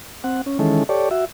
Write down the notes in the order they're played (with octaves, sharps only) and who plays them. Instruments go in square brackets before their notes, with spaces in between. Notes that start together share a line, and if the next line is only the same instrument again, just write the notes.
[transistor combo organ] C4 F#5
C#4
D#3 E3 G#3 C#4 A4
G4 A4 C#5 D5
F#4 E5